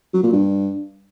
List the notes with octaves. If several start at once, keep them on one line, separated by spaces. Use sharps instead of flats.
F#3
A#2
G2